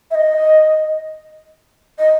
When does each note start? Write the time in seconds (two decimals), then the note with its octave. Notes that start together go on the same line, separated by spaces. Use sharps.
0.10 E5
0.14 D#5
1.98 D#5